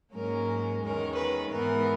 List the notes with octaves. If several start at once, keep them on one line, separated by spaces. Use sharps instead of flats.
G#2 F#3 A#3 C#4 A#4
E2 D#3 G#3 C#4 A#4
B4
G#2 E3 B3 A#4